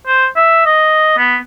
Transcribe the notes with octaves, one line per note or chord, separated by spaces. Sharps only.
C5
E5
D#5
B3